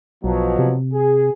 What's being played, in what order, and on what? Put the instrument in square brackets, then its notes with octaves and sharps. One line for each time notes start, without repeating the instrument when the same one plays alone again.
[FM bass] B1 [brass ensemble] B2 F3 F#3
[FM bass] C3
[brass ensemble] G#4